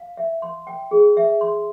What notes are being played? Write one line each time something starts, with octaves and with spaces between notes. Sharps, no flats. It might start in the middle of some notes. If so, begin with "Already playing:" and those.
Already playing: F5
E5
C6
G5
G#4
E5
C6